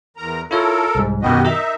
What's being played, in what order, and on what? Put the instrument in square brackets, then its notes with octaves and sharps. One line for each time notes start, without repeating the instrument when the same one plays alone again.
[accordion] E2 A#4 A#5
[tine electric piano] E4 F4 C#5 [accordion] A4 A#4
[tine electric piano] C2 G#2
[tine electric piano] F#2 B2 D#3 [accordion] F#4 G4 D#5
[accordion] D#4 E5 [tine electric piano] A#4 A#5